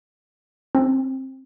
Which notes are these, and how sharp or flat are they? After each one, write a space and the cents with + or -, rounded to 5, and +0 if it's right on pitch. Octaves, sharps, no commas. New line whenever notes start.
C4 +20